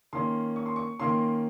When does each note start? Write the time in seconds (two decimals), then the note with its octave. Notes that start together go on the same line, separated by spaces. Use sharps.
0.13 D#3 A#3 C#4 C6
0.56 C#6
0.66 C6
0.76 C#6
1.00 D#3 A#3 C#4 C6